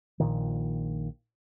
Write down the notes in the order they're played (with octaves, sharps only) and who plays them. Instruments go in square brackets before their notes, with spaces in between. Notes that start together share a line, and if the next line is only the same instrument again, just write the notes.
[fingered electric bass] A#1 A#2 D#3